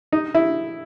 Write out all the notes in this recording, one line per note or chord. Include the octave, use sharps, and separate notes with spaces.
D#4
E4